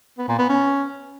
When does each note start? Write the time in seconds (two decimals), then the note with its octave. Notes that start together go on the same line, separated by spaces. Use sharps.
0.18 B3
0.28 A#2
0.39 B3
0.49 C#4